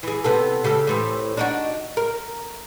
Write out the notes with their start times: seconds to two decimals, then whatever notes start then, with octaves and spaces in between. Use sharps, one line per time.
0.03 E3 G#4
0.24 C3 B3 A4
0.64 C#3 G4 A4
0.87 A2 E3 C4
1.37 D4 D#4 F#4
1.97 A#4